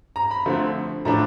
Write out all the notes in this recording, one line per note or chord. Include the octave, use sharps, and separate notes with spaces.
A#5
B5
D3 F3 A3 C4
A2 F3 A3 D4 A#5